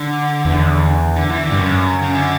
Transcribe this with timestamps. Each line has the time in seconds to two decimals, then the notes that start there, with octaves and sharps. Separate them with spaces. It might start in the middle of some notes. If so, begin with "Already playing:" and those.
Already playing: D3
0.45 E2
1.16 D3
1.30 E3
1.44 D3
1.51 G2
1.58 F#2 C#3
2.02 C#3
2.15 D3